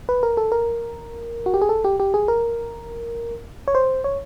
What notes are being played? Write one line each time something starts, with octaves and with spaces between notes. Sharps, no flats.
B4
A#4
A4
A#4
F#4
G4
G#4
A4
G4
G4
G#4
A#4
C#5
C5
C#5